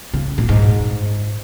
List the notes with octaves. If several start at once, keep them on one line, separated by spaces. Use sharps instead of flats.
C#3
A#2
G#2